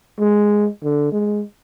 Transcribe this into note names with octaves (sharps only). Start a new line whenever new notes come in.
G#3
D3
G#3